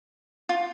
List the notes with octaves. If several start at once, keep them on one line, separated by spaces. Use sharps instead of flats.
F4